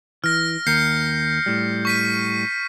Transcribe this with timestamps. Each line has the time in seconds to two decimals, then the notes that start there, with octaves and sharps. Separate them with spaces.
0.24 E3 F6 A#6
0.67 D#2 A#4 G6 C7 C#7
1.46 A2 G3
1.85 C#6 B6 D#7